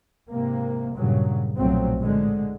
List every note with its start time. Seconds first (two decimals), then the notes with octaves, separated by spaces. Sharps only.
0.30 G#2 C3 A#3
0.94 G2 A#2 C#3 F#3
1.57 B1 A#2 F3 F#3 A3 C4
2.00 A2 D3 G#3